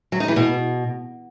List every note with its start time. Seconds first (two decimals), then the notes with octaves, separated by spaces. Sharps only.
0.12 F#3
0.20 D#4
0.28 E3
0.36 B2